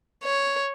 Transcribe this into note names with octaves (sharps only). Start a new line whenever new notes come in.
C#5